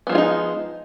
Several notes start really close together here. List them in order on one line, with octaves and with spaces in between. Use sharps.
B3 F3 G#3 F4 D#4